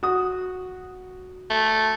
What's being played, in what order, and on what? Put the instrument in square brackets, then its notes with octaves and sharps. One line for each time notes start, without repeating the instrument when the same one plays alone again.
[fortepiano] F#4 D#6
[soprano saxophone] A3